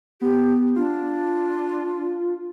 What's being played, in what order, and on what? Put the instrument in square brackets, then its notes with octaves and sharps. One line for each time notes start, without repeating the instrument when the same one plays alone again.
[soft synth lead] B3 [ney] G4
[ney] D4 [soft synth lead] F4